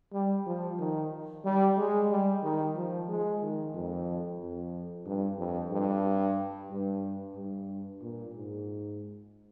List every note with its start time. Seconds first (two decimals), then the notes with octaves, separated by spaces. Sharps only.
0.13 G3
0.46 F3
0.79 D#3
1.45 G3
1.78 G#3
2.10 G3
2.43 D#3
2.76 F3
3.09 G#3
3.42 D#3
3.74 F2
4.41 F2
5.05 G2
5.38 F2
5.71 G2
6.70 G2
7.35 G2
8.01 A#2
8.34 G#2